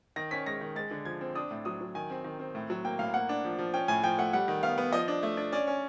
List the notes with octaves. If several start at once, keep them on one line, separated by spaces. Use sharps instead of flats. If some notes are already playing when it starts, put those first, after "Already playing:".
D#3 A#6
C#4 B6
G#3 A#6
D#3
G#3 A6
D3
F3 G#6
C4
D4 D#6
A2
F#3 D#6
F#3
D#3 G#5
C4
D#3
C4
A2
F#3
A#3 G5
A2 F5
A#3 F#5
D4
F3
F3
C#4 G5
A2 G#5
F3 G5
A3 F#5
G3 F#5
D#3
B3 F5
B3
F3 D#5
D4
A3
D4
C#4 D5
C#4